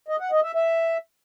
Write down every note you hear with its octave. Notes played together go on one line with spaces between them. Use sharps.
D#5
F#5
D#5
E5
E5